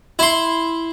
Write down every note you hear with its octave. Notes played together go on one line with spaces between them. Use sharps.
E4 C6